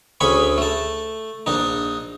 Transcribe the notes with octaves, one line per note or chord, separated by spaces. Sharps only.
D2 C#4 G#4 B5 C#6
A3 A5
A#1 D4 D#4